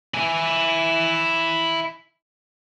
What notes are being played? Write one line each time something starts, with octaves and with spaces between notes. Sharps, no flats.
E4 G#5